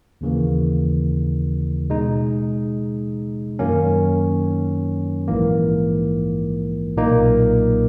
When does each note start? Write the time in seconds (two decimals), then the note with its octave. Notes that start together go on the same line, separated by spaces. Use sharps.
0.21 D#2 C#3 E3 A#3
1.90 B2 G#3 D#4
3.59 F#2 D#3 F#3 A#3 C#4
5.28 A#1 G#2 E3 A#3
6.97 B1 A#2 A#3 D#4